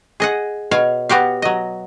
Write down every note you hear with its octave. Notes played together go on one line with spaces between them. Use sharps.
G#4 D#5 F#5
B2 C#5 F5
B3 F#4 G4 F5
F#3 D#5